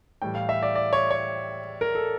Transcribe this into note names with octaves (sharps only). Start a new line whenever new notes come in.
A2 E3 G3 G5
F5
E5
D5
D5
C#5
C#5
A#4
A4